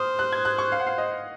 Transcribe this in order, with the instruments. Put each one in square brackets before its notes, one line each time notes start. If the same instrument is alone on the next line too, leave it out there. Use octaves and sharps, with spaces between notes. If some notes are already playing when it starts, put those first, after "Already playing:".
Already playing: [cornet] C5 [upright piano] D#6 F6
[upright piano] F#6
G#6
F#6
C#6
F5
F#5
F5
D#5